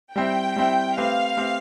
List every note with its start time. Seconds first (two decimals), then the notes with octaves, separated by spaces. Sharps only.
0.16 G3 C4 E4 G5
0.56 G3 C4 E4
0.97 A3 C4 G4 B4 F5
1.37 A3 C4 G4 B4